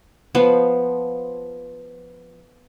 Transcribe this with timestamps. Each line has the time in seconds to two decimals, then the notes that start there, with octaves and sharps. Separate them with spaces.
0.35 F3 B3